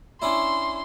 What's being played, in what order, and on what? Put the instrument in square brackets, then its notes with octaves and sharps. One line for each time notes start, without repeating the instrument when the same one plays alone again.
[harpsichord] C#4 D4 E4 [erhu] C6